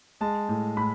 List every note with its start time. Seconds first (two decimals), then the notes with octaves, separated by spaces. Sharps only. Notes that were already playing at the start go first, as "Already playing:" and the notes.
0.21 G#3 A5
0.49 A2
0.77 A2 B5